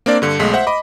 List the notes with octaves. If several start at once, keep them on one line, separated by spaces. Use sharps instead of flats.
A#3 C4 D4 D5
G2 D3
B1 G#3 A3 B6
C5 E5 F#5
D#5 B5 D6